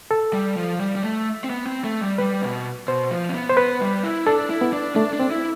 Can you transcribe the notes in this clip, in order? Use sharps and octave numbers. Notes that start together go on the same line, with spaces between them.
A4
G3
F3
G3
G3
A3
C4
B3
C4
A3
G3
G3 B4
B2
B2 C5
F3
C4
B3
C5
B3 B4
G3
E4
D4 A4
E4
B3
D4
A3 D4
D4
C4
E4